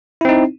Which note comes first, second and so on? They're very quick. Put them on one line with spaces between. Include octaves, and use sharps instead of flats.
E4 C4 D#4